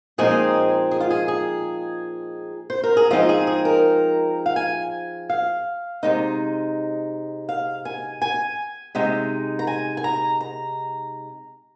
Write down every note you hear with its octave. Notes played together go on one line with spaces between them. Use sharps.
A#2 F3 G#3 C4 D#4 G#4
G#4
F4
G#4
G#4
C5
A#4
G#4
F3 G#3 C4 D#4 F4
G#4
G#4
A#4
F5
G#5
F5
C3 G#3 D#4
F5
G#5
G#5
C3 G#3 D#4
A#5
G#5
G#5
A#5
A#5